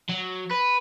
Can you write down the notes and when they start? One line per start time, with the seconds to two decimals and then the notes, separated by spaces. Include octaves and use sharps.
0.09 F#3
0.51 B4